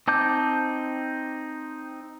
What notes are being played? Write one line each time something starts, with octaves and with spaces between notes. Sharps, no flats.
C4 D#4 A5 D6 G6